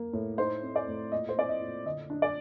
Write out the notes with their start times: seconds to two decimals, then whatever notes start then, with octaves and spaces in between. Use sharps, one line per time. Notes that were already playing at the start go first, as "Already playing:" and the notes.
Already playing: A#3
0.13 A2
0.38 D#4 C5
0.63 C4
0.76 D5
0.88 A2
1.12 A#2 D#5
1.29 C5
1.37 C4 D5
1.49 D#5
1.61 A#2
1.85 D3 D#5
2.10 D4
2.22 D5